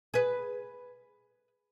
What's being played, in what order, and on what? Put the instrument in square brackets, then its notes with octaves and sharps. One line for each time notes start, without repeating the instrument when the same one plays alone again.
[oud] G#4 B4